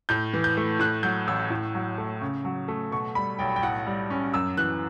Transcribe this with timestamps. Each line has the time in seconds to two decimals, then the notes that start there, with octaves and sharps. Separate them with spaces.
0.09 A2 G6
0.34 E3
0.44 G6
0.57 A3
0.79 A2 F#6
1.03 F#3 G6
1.27 A1 E6
1.50 A2
1.75 F#3
1.98 A3
2.21 C#3
2.45 F#3
2.68 A3
2.91 B2 C#6
3.15 G3 B5
3.39 B1 G5
3.56 G5
3.63 A2 F#5
3.86 G3
4.10 C#4
4.34 F#2 E6
4.57 E3 F#6